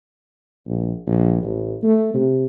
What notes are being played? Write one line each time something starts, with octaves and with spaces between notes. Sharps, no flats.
A#1
A#1
A1
A3
C3